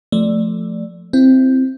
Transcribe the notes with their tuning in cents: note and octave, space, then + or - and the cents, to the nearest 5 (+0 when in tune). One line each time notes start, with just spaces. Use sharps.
F3 +0 A3 +0 D5 +0
C4 +0 E4 +25